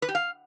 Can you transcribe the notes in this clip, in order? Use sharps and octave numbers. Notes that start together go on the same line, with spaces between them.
B4
G4
F5